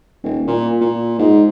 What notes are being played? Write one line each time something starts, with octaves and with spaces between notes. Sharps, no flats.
D#1
A#2
A#2
G#2